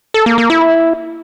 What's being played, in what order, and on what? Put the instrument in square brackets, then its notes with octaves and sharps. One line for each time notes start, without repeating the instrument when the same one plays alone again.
[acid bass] A4
A#3
A#3
E4